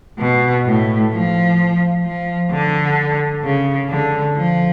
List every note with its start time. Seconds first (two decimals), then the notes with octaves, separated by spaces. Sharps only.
0.19 B2
0.65 A2
1.12 F3
2.04 F3
2.50 D3
3.43 C#3
3.89 D3
4.36 F3